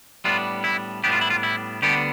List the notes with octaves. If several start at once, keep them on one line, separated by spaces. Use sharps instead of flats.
A2 G3 B3 D4 F4
E4
A2 G3 B3 D4 G4
F4
E4
F4
E4
D2 D3 G3 B3 D4 G4